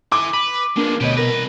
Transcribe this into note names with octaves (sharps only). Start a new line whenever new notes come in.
E4 G#5 D6
B4 B5
F3 G#3 A#3 B3 D4
D2 B2 G4 B4 C#5 D#5
C2 A#4 B4